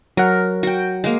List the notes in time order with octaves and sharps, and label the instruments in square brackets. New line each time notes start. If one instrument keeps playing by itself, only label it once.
[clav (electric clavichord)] F#3 F#5 [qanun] A#4
[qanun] F#4 G5
G#3 A#3